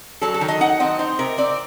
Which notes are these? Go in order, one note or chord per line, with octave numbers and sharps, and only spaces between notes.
F#3 A4
A4
D#3
D#5
D#4 F#5
C4 D#5
D#4 C5
C3 A#4
C4 D5